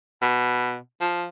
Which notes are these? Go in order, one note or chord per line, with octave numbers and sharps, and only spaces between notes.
B2
F3